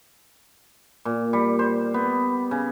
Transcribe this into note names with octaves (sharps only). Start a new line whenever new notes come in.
A#2
G3
C5
B3
C#3